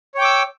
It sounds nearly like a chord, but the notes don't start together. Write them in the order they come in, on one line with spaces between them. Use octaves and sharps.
C#5 G5 D6 E6